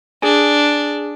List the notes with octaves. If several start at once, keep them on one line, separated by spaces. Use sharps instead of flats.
D4 G#4 G#5